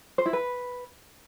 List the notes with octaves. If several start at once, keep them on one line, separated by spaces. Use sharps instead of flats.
C5
E4
B4